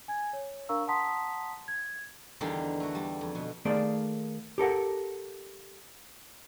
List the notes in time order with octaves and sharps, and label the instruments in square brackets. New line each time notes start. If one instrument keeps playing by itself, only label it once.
[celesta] G#5 G#6
C#5
D4 A#4 F5 A#5 C#6 E6
F#5 A5 A#5 C6 D#6 B6
G#6
[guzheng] E2 D3 D#3 G3 F5 G5
A3 F#4
G3
F2
B2
[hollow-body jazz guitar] D#3 A3 A#3 G#4 D5
G4 A4 A#4 F#5